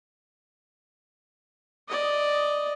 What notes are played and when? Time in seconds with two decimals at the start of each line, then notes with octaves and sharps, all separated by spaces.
1.88 D5 D#5